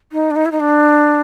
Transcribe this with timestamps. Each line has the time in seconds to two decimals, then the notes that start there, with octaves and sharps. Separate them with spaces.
0.12 D#4
0.31 D4
0.36 D#4
0.46 E4
0.52 D#4
0.60 D4